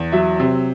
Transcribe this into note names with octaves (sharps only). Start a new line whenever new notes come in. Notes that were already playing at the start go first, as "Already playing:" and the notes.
Already playing: E2
F#3 E5
C3